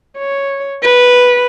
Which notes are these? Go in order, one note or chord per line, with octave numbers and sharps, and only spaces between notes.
C#5
B4